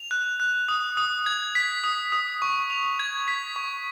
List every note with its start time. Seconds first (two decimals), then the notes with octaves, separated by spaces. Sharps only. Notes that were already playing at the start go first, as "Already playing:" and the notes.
Already playing: F7
0.11 F#6
0.40 F#6
0.68 D#6
0.97 D#6
1.26 G#6
1.55 B6
1.84 D#6
2.12 D#6
2.42 C#6
2.70 F7
2.99 G#6
3.28 B6
3.56 C#6